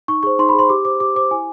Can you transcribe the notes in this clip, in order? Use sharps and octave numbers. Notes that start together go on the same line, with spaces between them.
D#4 C#6
G#4 C5 C#6
D#4 C6
B5
G#4 C5 C6
G4 D6
C5 D6
G4 D6
C5 D6
E4 G#5